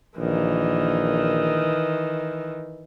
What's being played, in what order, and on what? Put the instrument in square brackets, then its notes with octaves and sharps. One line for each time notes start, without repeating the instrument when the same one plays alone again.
[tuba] A#1 [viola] D#3 E3